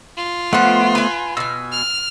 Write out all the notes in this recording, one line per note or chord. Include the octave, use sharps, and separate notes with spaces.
F4
F3 A3 B3 C5 F#5
B4 G#5
B2 G#5 E6
F6